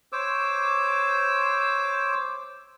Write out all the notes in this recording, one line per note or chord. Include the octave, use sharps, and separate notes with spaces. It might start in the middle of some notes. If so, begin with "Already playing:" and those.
C5 C#5 D6 E6